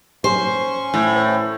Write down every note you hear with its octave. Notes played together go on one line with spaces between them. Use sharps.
C#4 C5 C#6
A2